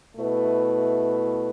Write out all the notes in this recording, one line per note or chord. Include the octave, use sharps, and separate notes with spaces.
B2 A3 E4 B4